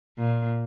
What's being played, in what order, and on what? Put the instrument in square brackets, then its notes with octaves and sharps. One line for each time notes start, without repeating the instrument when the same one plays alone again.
[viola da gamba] A#2